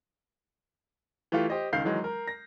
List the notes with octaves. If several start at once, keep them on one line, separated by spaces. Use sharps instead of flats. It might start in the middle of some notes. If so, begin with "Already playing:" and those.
E3 A3 F4 G4
G4 C5 D#5
C#2 D#3 F5 G6 C7
D#3 E3 F#3 G#3
A#4
A#6